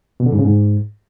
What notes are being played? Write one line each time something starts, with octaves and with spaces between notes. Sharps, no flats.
B2
D3
G#2
C#3
G#2